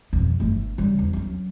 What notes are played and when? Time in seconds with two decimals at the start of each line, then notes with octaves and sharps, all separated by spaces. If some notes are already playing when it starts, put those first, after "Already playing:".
0.13 B1 F2
0.40 G1 A3
0.78 C#3 G3
0.99 E2
1.13 F#3 C#4